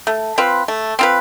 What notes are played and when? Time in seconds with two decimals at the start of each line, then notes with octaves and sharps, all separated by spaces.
0.07 A3
0.38 C4 F4 B4
0.68 A3
0.99 C4 F4 B4